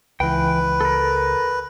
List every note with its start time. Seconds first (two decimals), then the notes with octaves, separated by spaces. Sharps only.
0.20 C#2 E3 B4 G5
0.81 A4 A#4